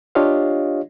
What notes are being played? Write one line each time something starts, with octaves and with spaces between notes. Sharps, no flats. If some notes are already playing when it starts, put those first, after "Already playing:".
D4 F4 G4 C#5 D#5 F5